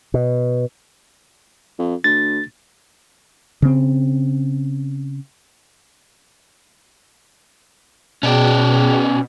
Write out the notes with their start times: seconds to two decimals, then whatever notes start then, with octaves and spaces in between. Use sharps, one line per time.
0.14 B2
1.79 F2
2.04 D2 A6
3.62 C#3 C4
8.23 B2 C#4 F#4 G#4 D5 G5